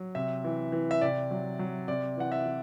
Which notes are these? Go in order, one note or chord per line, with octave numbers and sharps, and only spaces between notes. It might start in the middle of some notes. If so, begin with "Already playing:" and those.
Already playing: F#3
C3 E5
E3
E3
E5
C3 D5
F#3
F#3
C3 D5
E3 F#5
E5
E3